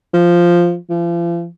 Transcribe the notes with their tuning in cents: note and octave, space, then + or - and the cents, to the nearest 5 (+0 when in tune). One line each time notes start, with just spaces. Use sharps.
F3 -5
F3 -40